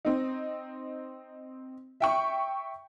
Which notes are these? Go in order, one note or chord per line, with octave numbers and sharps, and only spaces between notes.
C4 D#4
E5 G5 C#6